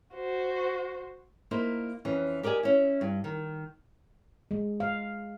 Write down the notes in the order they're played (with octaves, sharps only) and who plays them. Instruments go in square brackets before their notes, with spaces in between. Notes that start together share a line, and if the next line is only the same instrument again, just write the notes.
[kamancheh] F#4 C5
[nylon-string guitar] A#3 D#4 E4 C5
F2 E3 C#4
G4 A#4 D5 D#5 G#5
C#4 E4
G2
D#3
[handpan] G#3
F5